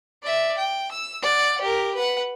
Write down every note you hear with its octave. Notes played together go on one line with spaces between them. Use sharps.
D5 E5
G5
E6
D5 F#5
G4 A#4
B4 F#5